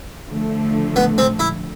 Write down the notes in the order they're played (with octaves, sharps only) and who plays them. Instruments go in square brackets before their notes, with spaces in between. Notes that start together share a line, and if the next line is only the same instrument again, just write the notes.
[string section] D3 F3 A3
[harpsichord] B3
C4
E4